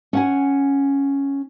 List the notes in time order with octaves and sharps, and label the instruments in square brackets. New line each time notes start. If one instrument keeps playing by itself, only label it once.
[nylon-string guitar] C#4 F#5 G#5